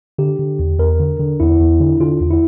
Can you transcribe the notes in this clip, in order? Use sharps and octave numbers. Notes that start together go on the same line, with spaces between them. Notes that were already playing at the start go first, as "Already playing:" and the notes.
D3 G4
D3
E2
E2 A#4
D3
D3
E2 E4
E2
D3
D3 F4
E2
E4